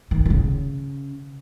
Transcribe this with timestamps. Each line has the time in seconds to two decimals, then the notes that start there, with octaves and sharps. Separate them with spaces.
0.11 D#3
0.26 D#3
0.30 C#3